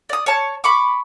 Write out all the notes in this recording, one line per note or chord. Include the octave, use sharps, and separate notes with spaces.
D5 D#6
C#5 A5
B5 C#6 D6